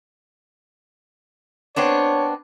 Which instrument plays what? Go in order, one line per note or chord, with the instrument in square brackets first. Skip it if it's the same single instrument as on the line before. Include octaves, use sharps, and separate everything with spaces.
[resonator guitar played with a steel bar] B3 C4 D4 [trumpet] C#5